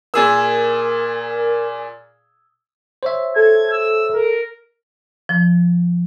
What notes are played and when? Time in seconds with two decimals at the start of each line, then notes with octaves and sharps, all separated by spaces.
0.14 A#2 G#4 A#4 E6
3.03 C5 C#5 E5
3.36 A4 G#6
3.71 E6
4.14 A#4
5.29 F3